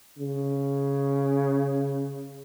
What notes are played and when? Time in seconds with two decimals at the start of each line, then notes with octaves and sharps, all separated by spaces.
0.18 C#3